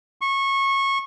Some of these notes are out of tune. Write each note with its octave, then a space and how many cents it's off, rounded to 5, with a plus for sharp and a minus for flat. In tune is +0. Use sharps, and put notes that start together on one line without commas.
C#6 -20